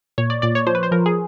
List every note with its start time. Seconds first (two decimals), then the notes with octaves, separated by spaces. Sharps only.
0.18 A#2 C#5
0.30 D5
0.42 A#2 D5
0.55 C#5
0.67 F3 C5
0.75 B4
0.83 C5
0.92 F3 A#4
1.06 G#4